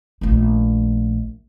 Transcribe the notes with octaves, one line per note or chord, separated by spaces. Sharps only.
A#1 A3